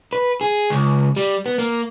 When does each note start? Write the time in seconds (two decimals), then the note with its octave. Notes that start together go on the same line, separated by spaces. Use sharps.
0.13 B4
0.41 G#4
0.70 C#2
1.16 G3
1.46 B3
1.58 A#3